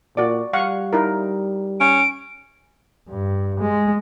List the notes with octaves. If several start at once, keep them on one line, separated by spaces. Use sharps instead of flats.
A#2 F#4 D5
G3 F5 F#5 C#6
D#4 E4 A#4
C#4 D7
G2
G#3